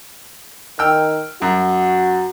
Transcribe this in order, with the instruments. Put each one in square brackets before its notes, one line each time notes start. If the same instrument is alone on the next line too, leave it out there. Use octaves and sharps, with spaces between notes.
[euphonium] D#3 [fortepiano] G5 E6 F6
[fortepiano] F#2 [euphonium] F#4